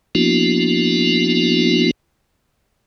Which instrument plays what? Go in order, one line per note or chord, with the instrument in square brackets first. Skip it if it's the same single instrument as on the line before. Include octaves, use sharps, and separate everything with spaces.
[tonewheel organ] F3 A#3 B3 D4 E4 F#4